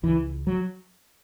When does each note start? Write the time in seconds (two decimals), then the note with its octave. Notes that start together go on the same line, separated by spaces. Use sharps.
0.03 C#2 E3
0.47 F#3